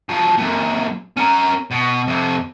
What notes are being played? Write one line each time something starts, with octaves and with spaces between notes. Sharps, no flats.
F3 F#3
F#2 A#2
C#4 A#4
B2
F2 C3